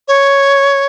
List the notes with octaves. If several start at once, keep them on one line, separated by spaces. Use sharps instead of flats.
C#5